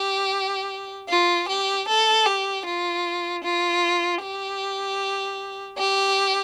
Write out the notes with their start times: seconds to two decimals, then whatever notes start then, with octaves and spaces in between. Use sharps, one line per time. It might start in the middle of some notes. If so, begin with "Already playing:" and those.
Already playing: G4
1.09 F4
1.48 G4
1.88 A4
2.26 G4
2.66 F4
3.44 F4
4.22 G4
5.78 G4